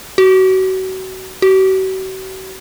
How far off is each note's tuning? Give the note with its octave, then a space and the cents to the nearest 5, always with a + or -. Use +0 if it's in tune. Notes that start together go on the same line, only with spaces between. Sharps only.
F#4 +30
F#4 +45